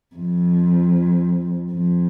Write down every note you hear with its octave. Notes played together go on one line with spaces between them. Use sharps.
F2
F2